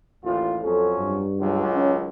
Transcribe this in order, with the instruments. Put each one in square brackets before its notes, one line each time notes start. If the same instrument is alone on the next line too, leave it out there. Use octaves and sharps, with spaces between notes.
[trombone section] A1 D#2 F4
[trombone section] F2 F#3 C#4 [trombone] A4
[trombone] G2
[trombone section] C#2 D#3 F#3
[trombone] C#4